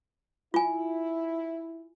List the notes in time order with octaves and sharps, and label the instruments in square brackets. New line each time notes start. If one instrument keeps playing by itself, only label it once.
[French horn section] E4 [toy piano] F4 G#5